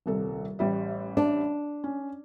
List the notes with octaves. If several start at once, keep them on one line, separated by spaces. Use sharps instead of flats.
D#1 C2 A4
A1 G3 E5
D4
C#4